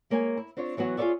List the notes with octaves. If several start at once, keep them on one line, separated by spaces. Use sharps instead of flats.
G#3 A#3 C#5 E5 G#5
E4
C4 D4 F4 C#5
E3 F#3 B3 F#4 C#5
F4 G#4 B4 C#5 D5 E5